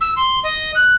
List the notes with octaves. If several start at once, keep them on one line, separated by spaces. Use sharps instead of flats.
E6
C6
D#5
F#6